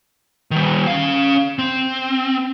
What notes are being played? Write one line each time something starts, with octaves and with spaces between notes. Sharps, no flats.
D#3 G3
C#4 F5
C4